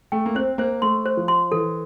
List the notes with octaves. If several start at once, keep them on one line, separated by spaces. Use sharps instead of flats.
A3 G5
A#3
C4 C5
A#3 C5
A3 C6
C5
F3
C6
E3 A4